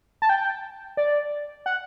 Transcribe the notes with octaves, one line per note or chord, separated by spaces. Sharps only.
A5
G5
D5
F#5